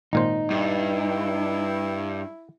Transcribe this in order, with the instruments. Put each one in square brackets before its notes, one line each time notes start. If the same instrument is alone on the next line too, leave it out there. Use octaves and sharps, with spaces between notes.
[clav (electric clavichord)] G#1 A#2 C5 [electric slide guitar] D#4
[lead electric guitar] G2 [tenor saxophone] E4